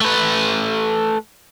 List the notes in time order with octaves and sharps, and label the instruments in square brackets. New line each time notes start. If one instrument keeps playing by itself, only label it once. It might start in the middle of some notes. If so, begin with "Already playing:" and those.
[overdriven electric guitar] A3 B4